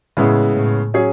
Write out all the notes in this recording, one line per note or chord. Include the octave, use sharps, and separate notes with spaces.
A2 C#3 G#3 B3 E4
A2
F#3 C#4 G#4